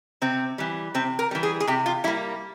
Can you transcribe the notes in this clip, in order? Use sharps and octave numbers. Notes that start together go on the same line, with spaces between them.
C3 C4
E3 G3
C3 C4
A#4
E3 G3
G#4
G#4
C3 G4
F4
G3 A#3 E4